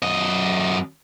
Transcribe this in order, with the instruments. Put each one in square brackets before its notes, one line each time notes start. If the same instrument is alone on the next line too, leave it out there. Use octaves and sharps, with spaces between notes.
[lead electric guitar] F#2 D#5